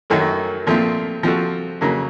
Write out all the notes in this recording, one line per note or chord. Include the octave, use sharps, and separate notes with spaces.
F#2 D#3 F#3 A3
A#2 F3 A3 C4
F3 C4 F#4 A4
F2 C#3 F#3 A#3